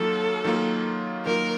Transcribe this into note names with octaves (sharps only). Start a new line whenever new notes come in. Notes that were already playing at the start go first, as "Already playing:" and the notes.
Already playing: D#3 F#3 A#3 F4 A4
D#3 F#3 A#3 F4
D#3 F#3 A#3 F4 A#4